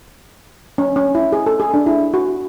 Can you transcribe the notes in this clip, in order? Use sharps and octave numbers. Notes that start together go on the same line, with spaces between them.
C#4
C#4
E4
G#4
A4
G#4
D4
E4
F#4